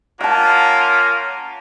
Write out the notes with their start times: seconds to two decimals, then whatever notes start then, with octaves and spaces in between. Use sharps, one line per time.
0.21 A#3 C#4 F4 F#5 A5